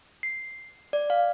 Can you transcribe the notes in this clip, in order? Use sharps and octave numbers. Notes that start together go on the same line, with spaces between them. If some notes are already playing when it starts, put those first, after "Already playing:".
C7
D5
F5